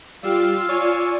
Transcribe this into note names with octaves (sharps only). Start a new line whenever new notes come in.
G3 F4 G4 F5 E6
C#5 D5 G#5